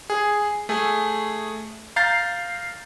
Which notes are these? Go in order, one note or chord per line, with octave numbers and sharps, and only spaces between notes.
G#4
A3 G#4
F5 A#5 G6 A6 C7